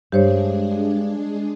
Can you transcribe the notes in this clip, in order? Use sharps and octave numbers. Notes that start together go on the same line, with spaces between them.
G2 G#3 D4 G4 G#4 C5 C#5